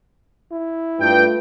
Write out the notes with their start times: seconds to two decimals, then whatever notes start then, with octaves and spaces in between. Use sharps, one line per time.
0.52 E4
1.00 G2 A3 F4 B4 G5